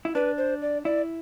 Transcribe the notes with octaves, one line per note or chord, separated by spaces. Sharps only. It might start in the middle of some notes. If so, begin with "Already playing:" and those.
E4
D4 B4
C5
D5
E4 D5